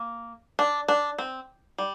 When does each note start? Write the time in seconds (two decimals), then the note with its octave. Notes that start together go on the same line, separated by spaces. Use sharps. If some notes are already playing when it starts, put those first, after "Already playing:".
Already playing: A#3
0.59 D4
0.88 D4
1.18 C4
1.78 G3